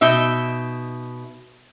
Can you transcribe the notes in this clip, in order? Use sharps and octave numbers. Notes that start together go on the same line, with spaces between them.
B2 D#4 E5